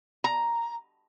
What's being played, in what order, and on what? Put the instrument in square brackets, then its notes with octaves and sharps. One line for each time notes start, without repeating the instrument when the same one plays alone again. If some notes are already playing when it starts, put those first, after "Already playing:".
[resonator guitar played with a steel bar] A#5